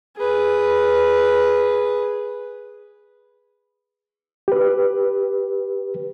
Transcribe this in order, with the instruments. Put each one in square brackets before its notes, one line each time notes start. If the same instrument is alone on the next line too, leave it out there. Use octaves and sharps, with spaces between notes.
[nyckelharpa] G#4 B4
[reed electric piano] G4 B4